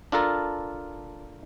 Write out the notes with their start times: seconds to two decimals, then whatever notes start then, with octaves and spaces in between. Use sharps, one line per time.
0.12 D4 F4 A4 A#4